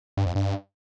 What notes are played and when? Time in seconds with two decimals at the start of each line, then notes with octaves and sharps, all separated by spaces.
0.17 G2
0.26 F2
0.35 G2